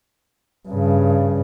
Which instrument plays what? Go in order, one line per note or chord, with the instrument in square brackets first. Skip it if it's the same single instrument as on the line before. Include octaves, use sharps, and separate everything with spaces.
[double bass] G2 C#3